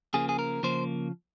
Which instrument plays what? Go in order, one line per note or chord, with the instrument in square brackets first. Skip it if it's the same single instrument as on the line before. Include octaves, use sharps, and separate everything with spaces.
[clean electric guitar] C#3 F3 A#3 G#4
G#4
A#4
C#3 F3 A#3 C5